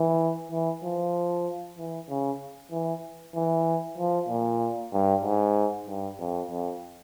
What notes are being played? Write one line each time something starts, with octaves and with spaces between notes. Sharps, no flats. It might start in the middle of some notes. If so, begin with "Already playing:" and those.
Already playing: E3
E3
F3
E3
C#3
E3
E3
F3
A#2
G2
G#2
G2
F2
F2